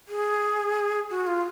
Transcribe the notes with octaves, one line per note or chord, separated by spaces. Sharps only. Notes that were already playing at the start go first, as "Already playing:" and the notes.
G#4
F#4
F4